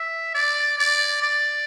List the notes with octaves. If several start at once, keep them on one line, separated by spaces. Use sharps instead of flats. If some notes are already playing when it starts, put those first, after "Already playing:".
Already playing: E5
D5
D5
D5